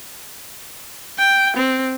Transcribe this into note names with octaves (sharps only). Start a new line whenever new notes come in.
G5
C4